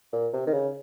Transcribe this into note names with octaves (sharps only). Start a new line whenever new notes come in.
A#2
C3
D#3
C#3